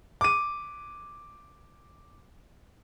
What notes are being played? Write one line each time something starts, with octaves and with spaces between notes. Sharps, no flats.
D6 D#7